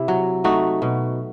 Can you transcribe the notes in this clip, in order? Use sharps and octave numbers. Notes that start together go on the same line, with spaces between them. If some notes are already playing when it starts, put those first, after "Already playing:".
Already playing: C3 E4
F#3
A3 D#4 F#4
B2